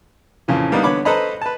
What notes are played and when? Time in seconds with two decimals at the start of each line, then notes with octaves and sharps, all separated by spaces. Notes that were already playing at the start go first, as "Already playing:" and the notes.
0.48 F2 A#2 C#3 E3
0.72 G3 A#3 B3 D4 D#4
0.83 D3 B3 C#5 B5 D6
1.05 A4 B4 C5 D#5 A#5 B5
1.42 B4 A5